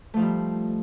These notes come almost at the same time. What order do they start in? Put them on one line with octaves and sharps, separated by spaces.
A3 F3 D#4 G3